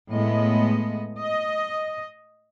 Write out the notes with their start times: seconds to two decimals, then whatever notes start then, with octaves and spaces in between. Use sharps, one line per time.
0.11 A2 G#3 B3 D#5
1.18 D#5